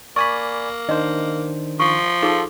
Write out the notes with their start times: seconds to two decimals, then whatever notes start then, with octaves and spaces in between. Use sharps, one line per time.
0.16 A#3 D5 G#5 B5 C#6
0.89 D#3 D4 C5 D#5
1.80 F3 C#6
2.22 D#4 F4 G#4 A4